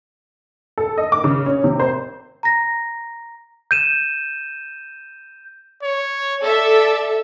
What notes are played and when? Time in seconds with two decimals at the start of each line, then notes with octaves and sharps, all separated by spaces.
0.78 A4
0.98 D#5
1.12 D6
1.24 C#3
1.46 C#4
1.64 C3
1.80 C5
2.43 A#5 A#6
3.71 G6 D#7 E7
5.83 C#5
6.42 A4 D5 E5